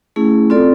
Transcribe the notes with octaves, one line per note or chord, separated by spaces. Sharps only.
A3 C#4 E4 G#4
C4 F4 A4 D5